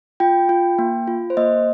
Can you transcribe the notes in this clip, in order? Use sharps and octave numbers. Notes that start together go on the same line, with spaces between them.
F4 G5
F4
A#3
F4
C5
A#3 D#5